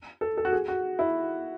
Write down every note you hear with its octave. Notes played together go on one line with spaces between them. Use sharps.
A4
A4
F#4
G#4
F#4
E4